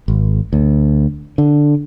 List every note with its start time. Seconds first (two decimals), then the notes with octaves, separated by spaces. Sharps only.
0.08 G#1
0.53 D2
1.38 D3